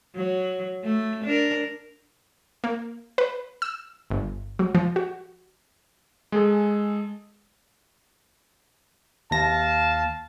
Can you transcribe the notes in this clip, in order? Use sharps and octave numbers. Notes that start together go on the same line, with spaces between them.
F#3
A3
D4 A#4
A#3
B4
E6
G1
F#3
F3
F#4
G#3 G#4 A4
D#2 F5 A5 A#6